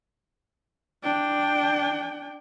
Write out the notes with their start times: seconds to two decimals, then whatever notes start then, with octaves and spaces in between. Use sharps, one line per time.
1.03 D4 G5